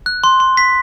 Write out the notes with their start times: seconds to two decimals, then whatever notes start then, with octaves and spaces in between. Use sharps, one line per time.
0.06 F#6
0.24 C6
0.40 C6
0.57 B6